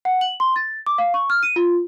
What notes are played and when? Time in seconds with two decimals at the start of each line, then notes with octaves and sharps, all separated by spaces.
0.05 F#5
0.21 F#7
0.40 C6
0.56 A6
0.87 D6
0.98 F5
1.14 C#6
1.30 F6
1.43 D#7
1.56 F4